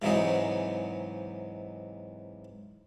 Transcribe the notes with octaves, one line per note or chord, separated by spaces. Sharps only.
G#2 C3 E3 F#3 D#4 G#4